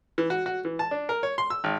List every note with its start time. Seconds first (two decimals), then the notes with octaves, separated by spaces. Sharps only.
0.18 E3
0.30 F#4
0.46 F#4
0.65 E3
0.79 A5
0.91 D4
1.09 A#4
1.23 C#5
1.38 C6
1.50 E6
1.64 G#1